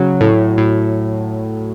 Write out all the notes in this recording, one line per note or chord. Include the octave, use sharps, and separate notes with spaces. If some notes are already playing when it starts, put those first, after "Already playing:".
Already playing: C#3 F#3
A2
A2